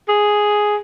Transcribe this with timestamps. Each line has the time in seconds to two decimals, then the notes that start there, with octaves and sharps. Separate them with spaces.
0.08 G#4